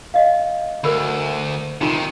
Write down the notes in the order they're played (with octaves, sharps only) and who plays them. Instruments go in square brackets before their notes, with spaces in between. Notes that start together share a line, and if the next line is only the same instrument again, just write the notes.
[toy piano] D#5 F5
[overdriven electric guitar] D2 [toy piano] A#4 B5
[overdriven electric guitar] C3 D#3 [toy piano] D#4 F4 A#5